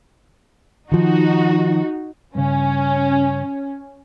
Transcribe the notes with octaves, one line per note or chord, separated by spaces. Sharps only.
D#3 F3 D#4 F#4
G2 C#3 C#4